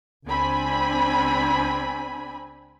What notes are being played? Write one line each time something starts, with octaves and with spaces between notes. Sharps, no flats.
C#2 C4 D4 G#5 B5